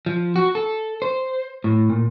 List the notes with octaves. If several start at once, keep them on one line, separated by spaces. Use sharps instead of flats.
F3
F#4
A4
C5
A2
A#2